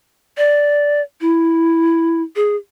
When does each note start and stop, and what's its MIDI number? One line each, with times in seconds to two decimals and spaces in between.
0.37 1.01 74
1.21 2.22 64
2.36 2.56 68